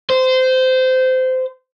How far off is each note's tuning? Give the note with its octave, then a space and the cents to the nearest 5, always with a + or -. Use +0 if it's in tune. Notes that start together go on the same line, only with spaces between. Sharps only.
C5 -20